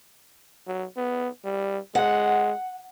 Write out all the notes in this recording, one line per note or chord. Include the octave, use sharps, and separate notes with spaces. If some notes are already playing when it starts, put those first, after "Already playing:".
F#3
B3
G3
G#3 F#5